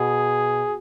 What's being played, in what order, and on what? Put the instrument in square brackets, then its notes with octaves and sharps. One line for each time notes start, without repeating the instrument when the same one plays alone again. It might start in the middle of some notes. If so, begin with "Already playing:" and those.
Already playing: [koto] B2 [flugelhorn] G#4